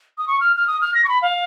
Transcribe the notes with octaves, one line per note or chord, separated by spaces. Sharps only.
D#6
C#6
F6
F6
D#6
F6
A#6
C#6
B5
F5